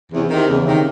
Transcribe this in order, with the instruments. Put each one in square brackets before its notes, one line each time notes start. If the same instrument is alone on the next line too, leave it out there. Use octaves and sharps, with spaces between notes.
[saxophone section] E2 [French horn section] C3
[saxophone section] C3 D#3
[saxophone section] E2 [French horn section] C#3
[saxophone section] C3 D#3